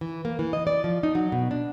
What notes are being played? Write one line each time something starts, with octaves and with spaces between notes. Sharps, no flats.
E3
A#3
E3
D#5
D5
F3
D#4
F#3
B2
D4